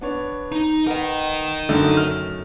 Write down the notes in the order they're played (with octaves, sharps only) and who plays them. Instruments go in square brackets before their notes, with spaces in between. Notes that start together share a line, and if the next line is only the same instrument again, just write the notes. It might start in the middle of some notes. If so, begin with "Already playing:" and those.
[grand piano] B3 D4 C#5
[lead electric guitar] D#4
[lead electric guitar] A#4 D#5 [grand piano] B4 F#5
[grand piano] F#2 D#3 A3 [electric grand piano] D3 D#4
[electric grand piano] F6